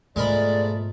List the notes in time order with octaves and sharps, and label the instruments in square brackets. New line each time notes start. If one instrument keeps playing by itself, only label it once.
[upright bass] G#2 B2 [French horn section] F3 A3 [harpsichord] G#3 A#4 B5 [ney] D5